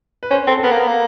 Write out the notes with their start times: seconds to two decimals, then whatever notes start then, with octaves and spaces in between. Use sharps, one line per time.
0.23 B4
0.31 C#4 C5
0.47 C4 A4
0.58 A4
0.63 B3 A#4
0.71 A#3
0.79 B3
0.87 A#3